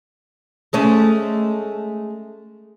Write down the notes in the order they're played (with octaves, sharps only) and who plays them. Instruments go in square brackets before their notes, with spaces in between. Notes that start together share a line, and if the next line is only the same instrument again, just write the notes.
[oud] G#3 A3 C#4